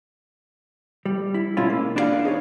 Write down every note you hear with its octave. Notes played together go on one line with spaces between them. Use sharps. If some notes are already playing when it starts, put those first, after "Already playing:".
G3
E4
B2 G#3 C#4 E4 F4
A#3
E2 D4 E4 F4 D5 F5
D#4 G#4 A#4 C#5